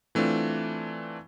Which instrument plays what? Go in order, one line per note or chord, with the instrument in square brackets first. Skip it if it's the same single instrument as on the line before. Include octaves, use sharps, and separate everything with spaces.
[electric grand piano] E3 A3 C4 D4 F4